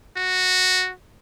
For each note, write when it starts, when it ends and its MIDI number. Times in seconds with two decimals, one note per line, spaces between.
0.16 0.91 66